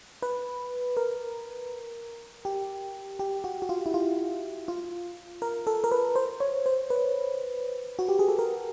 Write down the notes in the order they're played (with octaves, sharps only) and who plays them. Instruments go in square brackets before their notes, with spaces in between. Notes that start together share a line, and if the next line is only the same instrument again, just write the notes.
[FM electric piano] B4
A#4
G4
G4
F#4
F#4
F4
E4
F4
F4
A#4
A4
A#4
B4
C5
C#5
C5
B4
F#4
G4
G#4
A4
A#4